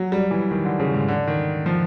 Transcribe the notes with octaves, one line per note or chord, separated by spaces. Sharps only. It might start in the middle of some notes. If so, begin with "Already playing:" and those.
Already playing: F#3
G3
E3
D#3
D3
C#3
G#2
D3
D#3
F3